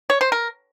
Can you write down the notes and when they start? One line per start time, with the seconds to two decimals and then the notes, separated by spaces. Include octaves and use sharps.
0.10 C#5
0.21 C5
0.32 A#4